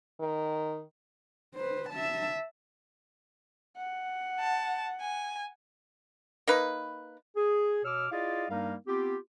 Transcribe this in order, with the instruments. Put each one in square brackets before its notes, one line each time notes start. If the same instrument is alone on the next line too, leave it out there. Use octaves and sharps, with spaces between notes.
[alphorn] D#3
[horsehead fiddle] B4 C5
E5 A5
[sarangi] F#5
[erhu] A5
G#5
[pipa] A#3 D#4 B4
[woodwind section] G#4
B2 C#5 D6 E6 F6
E4 F4 G#4 D5 D#5 F5
G2 G3 A#3 D#4 A#4 F5
B3 C4 F4 G4